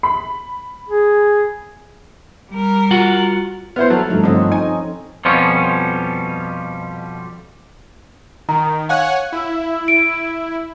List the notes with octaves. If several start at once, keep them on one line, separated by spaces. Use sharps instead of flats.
B5
G#4
G3 A#4
F4 F#4 F#5
B3 E4 C5 F6
F#3 A4 A5 F6
G2 F3 A3 D#4
D3 C4 C#4 D#5
D#4 G#5
F2 B2 F3 G3 C#4
D#3 A#5
C#5 F5 F#5 G#5 F#6
E4
D7